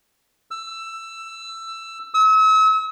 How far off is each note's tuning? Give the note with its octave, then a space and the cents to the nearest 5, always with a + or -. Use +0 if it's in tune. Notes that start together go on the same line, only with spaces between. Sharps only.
E6 +15
E6 -40